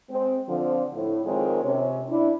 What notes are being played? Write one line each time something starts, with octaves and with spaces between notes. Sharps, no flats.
G#3 C4
D3 F3 C4
A2
F2 D#3 G#3 C4 A#4 C#5
C3 C#4
D4 E4